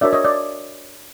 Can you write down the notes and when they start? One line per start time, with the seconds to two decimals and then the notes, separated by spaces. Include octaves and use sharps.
0.01 D4 F#4 A#4 C#5 D5 E5
0.13 C#5 D#5
0.24 D5